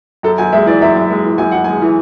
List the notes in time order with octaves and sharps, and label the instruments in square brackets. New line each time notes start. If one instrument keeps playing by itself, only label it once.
[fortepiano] F#2 [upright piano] A4
[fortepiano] F#2 [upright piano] G#5
[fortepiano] G#3 [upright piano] E5
[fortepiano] E3 [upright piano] D5
[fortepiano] F#2 [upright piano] E5
[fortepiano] F#2
G#3
E3
[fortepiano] F#2 [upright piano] G#5
[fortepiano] F#2 [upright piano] F#5
[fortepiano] G#3 [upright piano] G#5
[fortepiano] E3